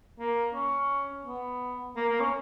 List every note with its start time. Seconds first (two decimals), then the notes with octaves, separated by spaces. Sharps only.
0.19 A#3
0.54 C#4
1.25 B3
1.96 A#3
2.08 A#3
2.20 C#4